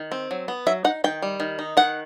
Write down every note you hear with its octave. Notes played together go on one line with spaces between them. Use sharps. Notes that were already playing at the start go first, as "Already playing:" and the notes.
Already playing: D#3
C4
F#3
B3
F#3 E5
D#4 F#5
D#3 G5
G3
D#3
D#4
D#3 F#5